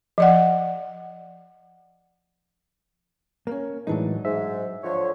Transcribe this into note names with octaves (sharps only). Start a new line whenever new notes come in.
F3 D5 F#5
A#3 C#4
A2 E3 F#3 G#3 D4 D#4
G#2 E5
D3 F3 C#5